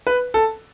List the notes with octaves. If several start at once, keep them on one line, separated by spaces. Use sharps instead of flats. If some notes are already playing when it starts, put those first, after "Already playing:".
B4
A4